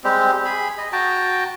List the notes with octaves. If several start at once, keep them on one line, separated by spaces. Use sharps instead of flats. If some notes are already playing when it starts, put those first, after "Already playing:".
G3 G#3 C4 G4
G#4 B5
D#5
F#4 G5 A5 A#5